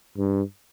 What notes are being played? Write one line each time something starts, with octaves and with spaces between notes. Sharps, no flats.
G2